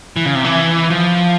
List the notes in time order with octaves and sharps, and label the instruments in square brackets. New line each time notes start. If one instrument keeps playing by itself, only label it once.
[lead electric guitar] E3
C#3
C3
E3
F3